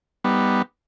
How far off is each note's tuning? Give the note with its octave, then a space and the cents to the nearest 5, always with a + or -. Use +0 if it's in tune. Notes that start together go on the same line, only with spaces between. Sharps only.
G3 +0 B3 +0 D#4 -10